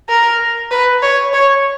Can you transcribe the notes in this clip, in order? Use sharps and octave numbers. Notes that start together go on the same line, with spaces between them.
A#4
B4
C#5
C#5